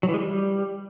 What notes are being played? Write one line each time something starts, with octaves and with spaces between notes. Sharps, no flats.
F#3
E3
G#3
G3